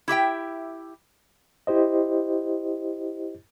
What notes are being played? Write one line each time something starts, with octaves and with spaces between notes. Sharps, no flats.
E4 G4 E5 G5
E4 G4 C5 D#5